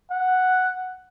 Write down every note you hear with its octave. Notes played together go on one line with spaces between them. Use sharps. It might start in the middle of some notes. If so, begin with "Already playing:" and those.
F#5